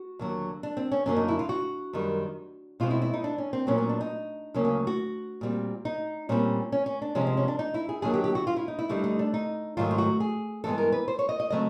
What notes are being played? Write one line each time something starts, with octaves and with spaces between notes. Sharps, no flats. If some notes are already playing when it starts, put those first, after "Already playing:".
Already playing: F#4
D#2 D3 F#3
D4
C4
C#4
F#2 D3 F#3 A#3 C#4
D#4
E4
F4
F#4
F#2 D#3 G3
B2 G#3 C4 F4
E4
E4
D#4
D4
C#4
C4
A#2 F#3 B3 C#4
C#4
D4
D#4
D2 C#3 F#3 A#3 C#4
C#4
F#4
A#2 G3 C4
D#4
A#2 G3 C4 C#4
C#4
C#4
D4
C3 F3 G#3 C#4
C4
C#4
D4
D#4
E4
G#4
D#2 D3 F#3 A#3 G#4
G4
G4
F#4
F4
E4
D#4
E4
D2 D3 G3 D#4
D#4
D4
D#4
G#2 D#3 F#3 A3 F4
F4
F#4
G#4
G2 E3 G#3 B3 A4
A#4
B4
C5
C#5
D#5
D#5
C#3 F#3 A3 C4 D#5